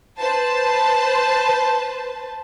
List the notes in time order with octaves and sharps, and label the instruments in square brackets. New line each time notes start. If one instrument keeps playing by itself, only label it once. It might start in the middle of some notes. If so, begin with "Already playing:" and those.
[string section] B4 C5 A5